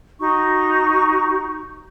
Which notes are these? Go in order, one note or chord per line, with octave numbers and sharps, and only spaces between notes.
D#4 F#4 C#6